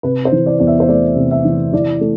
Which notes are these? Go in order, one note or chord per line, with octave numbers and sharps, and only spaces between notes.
C3 B4
C5
E3
D5
E2 D5
E5
C5
A3 D5
C3
E5
E3
E3 D5
A3